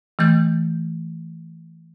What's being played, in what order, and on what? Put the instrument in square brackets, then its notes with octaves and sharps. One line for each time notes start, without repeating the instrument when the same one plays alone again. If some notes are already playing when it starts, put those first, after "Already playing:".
[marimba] E3 A3 G6